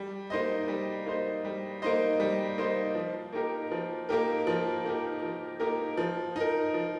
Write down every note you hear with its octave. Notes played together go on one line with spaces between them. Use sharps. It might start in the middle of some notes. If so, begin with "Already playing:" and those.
Already playing: G3
A#3 D#4 C5 D#5
G3
A#3 D#4 C5 D#5
G3
A#3 D#4 C5 D#5
G3
A#3 D#4 C5 D#5
F3
A#3 D#4 G4 A#4
F3
A#3 D#4 G4 A#4
F3
A#3 D#4 G4 A#4
F3
A#3 D#4 G4 A#4
F3
D#4 A#4
F3